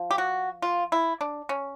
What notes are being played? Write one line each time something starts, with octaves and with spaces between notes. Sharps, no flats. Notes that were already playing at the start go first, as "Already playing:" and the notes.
Already playing: F3
G4
F#4
F4
E4
D4
C#4